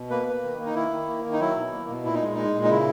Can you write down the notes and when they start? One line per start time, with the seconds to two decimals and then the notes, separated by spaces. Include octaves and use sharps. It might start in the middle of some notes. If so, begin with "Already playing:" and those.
Already playing: B2
0.10 A#3 B4
0.26 A#3
0.43 D#3
0.59 A#3
0.66 D#4
0.75 D#3 E4
0.91 D#3
1.07 A#3
1.24 D#3
1.33 D#4
1.40 F#3 E4
1.56 B2
1.72 A#3
1.89 B2
2.05 A#2 E4
2.15 D#4
2.21 G#3
2.34 G#3 D#4
2.54 A#2
2.64 D#4
2.70 C#3 E4